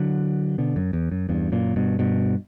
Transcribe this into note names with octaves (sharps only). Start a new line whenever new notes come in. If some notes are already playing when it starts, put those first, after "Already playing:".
Already playing: D3 F#3
B2 D3
F#2
E2
F#2
E2 G2
F#2 A#2
G2 B2
G2 B2